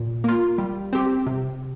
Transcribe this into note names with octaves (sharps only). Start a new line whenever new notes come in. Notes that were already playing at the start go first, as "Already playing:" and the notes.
Already playing: A#2
A#3 F4
G3
C4 G4
C3